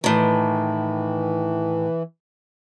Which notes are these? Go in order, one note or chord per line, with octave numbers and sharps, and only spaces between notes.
A2 D#3 E3